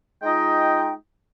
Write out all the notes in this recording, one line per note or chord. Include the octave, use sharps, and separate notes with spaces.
G#3 D#4 F4 D#5 G5